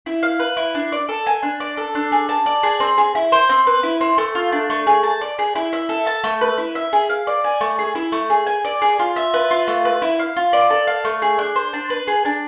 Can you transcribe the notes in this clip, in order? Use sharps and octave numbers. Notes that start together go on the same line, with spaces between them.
E4
F5
B4
E4
D4
D5
A4
G#5
D4
D5
A4
D4
G#4
A5
D5
G#4
C4
G#4
E4
C5
C4
B4
E4
C4
A3
F4
D4
A3
G#4
A5
D5
G#4
E4
E5
A4
A5
A3
B4
E4
E5
G#4
F5
D5
G#5
A3
G#4
E4
A3
G#4
G#5
D5
G#4
F4
E5
B4
F4
A3
B4
E4
F5
F4
D5
A4
F5
A3
G#4
D4
C5
D4
B4
G#4
D4